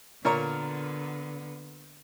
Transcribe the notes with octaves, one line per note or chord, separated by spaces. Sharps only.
A#2 D3 B3 A#4 C#5